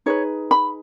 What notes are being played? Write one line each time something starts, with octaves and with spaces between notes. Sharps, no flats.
D#4 G#4 B4 C#5
B5